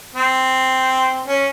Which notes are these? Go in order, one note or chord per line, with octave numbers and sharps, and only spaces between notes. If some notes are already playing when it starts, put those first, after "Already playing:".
C4
C#4